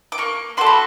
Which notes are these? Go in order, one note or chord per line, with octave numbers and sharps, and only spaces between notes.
D6
A#3 C#6
D4 F#4 A4 C6
B5